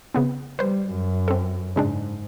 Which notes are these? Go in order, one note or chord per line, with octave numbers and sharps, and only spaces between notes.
C#3 B3 C4
G3 B4 C5
F#2
C4 A4
G#2 C#3 G#3 D4